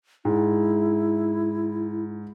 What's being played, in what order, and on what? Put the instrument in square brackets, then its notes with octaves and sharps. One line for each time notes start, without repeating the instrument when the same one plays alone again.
[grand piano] G#2 [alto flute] E4